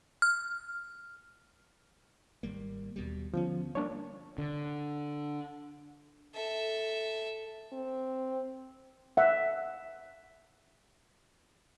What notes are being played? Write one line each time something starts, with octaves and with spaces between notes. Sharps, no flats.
F6
G#1 G3 A#3
D#2 B2 G3
D3 F3 B3 C#4
G3 A#3 D4 C#5
D3
A4 E5
C4
E5 F#5